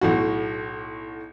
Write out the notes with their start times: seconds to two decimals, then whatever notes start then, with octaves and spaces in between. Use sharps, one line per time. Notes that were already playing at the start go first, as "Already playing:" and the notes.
0.01 B1 A2 F#4